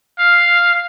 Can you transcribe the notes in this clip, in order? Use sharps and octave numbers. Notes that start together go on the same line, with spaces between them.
F5